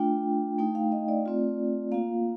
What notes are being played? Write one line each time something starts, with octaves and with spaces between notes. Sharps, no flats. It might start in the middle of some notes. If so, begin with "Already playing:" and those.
Already playing: A3 D4 F4 G5
A3 D#4 G5
F5
D#5
D5
A3 C4 F4
A#3 F4 F5